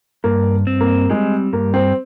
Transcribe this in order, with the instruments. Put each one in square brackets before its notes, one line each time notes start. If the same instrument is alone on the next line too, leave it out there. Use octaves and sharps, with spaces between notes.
[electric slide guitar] G2 [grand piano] A#3
[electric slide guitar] C4
[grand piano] A#3
[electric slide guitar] G3 [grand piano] G#3
[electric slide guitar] G2 [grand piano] A#3
[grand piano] C4